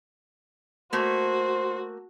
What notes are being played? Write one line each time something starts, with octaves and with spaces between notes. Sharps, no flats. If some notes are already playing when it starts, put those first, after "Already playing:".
A3 A#3 F#4 C5